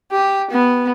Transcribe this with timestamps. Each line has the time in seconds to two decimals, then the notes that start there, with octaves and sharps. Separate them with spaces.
0.12 G4
0.51 B3